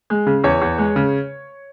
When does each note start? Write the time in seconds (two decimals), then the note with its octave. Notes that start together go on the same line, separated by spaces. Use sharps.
0.10 G#3
0.27 C#3
0.44 E2 C#5
0.61 E2
0.78 G#3
0.96 C#3